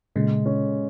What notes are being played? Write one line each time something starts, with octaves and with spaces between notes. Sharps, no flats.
A#2 C#3 G#3
C#4